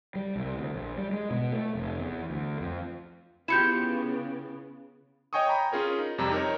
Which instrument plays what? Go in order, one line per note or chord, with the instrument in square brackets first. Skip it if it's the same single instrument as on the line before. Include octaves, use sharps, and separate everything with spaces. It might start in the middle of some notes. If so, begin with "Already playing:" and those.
[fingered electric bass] G3
C2
D2
A#1
G3
G#3
B2
A3
F1
E2
D2
F2
[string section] C#3 B3 [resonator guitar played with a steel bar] E4 F4 G4 [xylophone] G6 C#7 E7
[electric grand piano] C#5 D#5 G5 G#5 C#6 D#6
G5 G#5 A#5 B5
C#4 F4 G#4 A#4 C#5
D#4
F2 C3 G3 A#5 E6
D#4 A#4 C#5